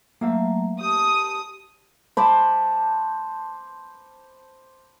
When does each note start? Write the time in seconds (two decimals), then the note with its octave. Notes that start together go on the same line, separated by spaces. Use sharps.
0.21 F#3 A3 A#3 E5 F5 A#5
0.81 G4 A5 D#6
2.17 C5 A5 B5 D6